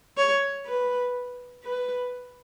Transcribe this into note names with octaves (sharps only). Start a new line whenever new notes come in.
C#5
B4
B4